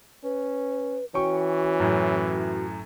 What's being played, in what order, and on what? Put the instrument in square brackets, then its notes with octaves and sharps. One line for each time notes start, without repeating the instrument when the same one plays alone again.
[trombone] C#4 [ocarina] B4
[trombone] E3 [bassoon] C#4 [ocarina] F#4 [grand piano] G5 C#6
[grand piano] F#2 A2